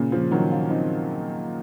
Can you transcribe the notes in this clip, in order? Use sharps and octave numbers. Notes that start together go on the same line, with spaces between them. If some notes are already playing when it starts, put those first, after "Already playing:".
Already playing: A#2 C#3
C#3 F3
D#3 F#3
C#4 F4
C4 D#4